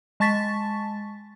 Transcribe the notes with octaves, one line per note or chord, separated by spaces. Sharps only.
G#3 A5 C#6 A6 B6